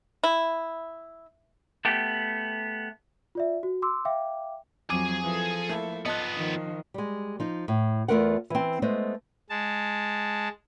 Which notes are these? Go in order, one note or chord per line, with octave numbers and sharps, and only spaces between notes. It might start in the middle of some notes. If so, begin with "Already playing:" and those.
E4
A3 B3 G4
F4 D5 E5
F#4
C6 D6 E6
E5 F5 G5 D6
F2 F#3 G#4 G#5 D6
E3 F3 A4
A3 A#3 E4
B3 F4 D#5 A5 F#6
D#3 F3
G3 G#3
F3 D#4
A2
E2 F#3 A3 F4 A#4 F#5
E3 C4
G#3 A3 B3 C5 D#5
G#3 A5